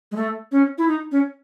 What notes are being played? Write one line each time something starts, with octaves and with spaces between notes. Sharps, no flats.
G#3
A3
C#4
E4
D#4
C#4